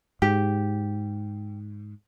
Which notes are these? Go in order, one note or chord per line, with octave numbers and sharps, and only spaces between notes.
G#2 G4